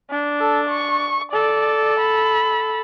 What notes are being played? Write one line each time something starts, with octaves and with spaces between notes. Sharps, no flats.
D4
A4
C#6
A4 D5
B5